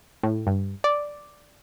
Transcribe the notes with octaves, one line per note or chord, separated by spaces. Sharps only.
A2
G2
D5